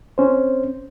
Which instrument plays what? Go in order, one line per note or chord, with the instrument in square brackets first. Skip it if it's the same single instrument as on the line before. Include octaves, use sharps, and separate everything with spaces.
[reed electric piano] C4 C#4 C5